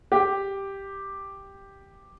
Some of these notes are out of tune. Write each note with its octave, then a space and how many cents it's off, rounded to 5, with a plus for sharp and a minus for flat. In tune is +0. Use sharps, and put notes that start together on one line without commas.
G4 +0